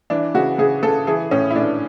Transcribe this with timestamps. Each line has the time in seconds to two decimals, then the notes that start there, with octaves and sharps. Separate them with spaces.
0.10 E3 D4
0.34 C#3 F#4
0.58 C#3 G#4
0.83 C#3 A4
1.07 E3 G#4
1.31 A2 C#4
1.51 E4
1.56 A2 D4